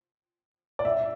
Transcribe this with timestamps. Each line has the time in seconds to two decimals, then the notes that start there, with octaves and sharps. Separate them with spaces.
0.79 D5
0.85 E5